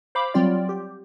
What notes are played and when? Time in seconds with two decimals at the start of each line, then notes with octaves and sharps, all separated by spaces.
0.15 C5 F5 B5 D6
0.34 F#3 G3 C4 F4 D5
0.69 G4